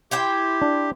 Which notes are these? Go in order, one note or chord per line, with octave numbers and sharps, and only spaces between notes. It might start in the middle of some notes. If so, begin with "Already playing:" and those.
E4 G4 C5 G5
D4